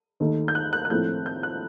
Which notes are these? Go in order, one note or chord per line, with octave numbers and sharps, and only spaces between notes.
D#2 D#3 A3
G6
F#6
F#6
F#6
A#1 A2 A3 C4 G6
G6
F#6